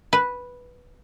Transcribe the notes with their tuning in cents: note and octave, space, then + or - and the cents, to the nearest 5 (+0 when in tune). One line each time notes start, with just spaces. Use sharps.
B4 -5